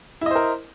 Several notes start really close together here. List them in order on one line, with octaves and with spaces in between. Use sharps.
E4 D#5 C5 A#4